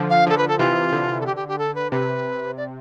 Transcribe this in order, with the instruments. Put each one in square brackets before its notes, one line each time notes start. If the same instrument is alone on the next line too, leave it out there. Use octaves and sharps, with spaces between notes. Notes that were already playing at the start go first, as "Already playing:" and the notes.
Already playing: [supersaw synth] D3 F3
[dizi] F5
[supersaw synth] D3 F3 [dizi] A4
[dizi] B4
A4
[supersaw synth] C3 E3 [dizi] F4
[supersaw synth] D3
[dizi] A4
G4
G4
G4
A4
B4
[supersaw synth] C3 [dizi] B4
[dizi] D5